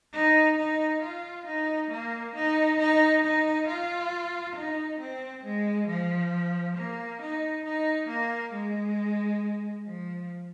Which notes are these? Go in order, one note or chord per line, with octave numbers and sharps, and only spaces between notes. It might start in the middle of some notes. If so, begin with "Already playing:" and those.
D#4
D#4
F4
D#4
A#3
D#4
D#4
D#4
F4
D#4
C4
G#3
F3
A#3
D#4
D#4
A#3
G#3
F3